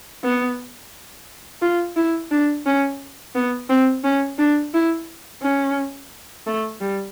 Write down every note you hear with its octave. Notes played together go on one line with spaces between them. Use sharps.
B3
F4
E4
D4
C#4
B3
C4
C#4
D4
E4
C#4
A3
G3